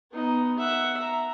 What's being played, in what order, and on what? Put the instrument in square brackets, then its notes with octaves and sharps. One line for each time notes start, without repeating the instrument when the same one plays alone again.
[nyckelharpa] B3 D#4
E5 F#5
A#5